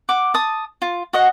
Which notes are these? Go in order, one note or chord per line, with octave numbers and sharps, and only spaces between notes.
F#5 D6
A5 D#6
F4
F#4 D#5 F#5